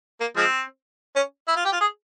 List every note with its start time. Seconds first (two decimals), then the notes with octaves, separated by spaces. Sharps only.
0.20 A#3
0.36 F3 G#3 C4
1.16 C#4
1.47 E4
1.56 F4
1.65 G4
1.72 F4
1.80 G#4